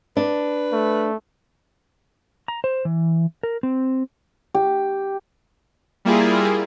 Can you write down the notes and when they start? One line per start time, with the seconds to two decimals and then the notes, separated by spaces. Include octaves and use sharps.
0.17 D4 B4
0.73 A3
2.48 A#5
2.64 C5
2.85 E3
3.43 A#4
3.63 C4
4.54 G4
6.05 G3 A#3 E4 F4 G#4